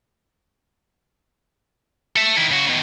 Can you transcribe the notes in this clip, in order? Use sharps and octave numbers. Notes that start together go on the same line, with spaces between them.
A4 E5
D#3 E4
C#3 F#4
B2 D#3